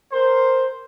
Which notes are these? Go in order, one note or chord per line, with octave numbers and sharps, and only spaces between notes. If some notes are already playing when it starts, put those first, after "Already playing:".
A#4 C5